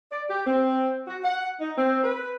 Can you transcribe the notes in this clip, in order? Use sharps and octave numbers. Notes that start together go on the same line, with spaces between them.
D5
G4
C4
F#4
F#5
D#4
C4
B4